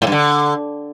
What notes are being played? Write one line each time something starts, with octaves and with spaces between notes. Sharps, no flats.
A2
G2
D3